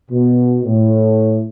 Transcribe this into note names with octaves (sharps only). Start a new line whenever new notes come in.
B2
A2